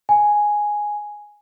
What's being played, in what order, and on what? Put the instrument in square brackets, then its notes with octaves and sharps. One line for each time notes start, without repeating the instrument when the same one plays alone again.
[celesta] G#5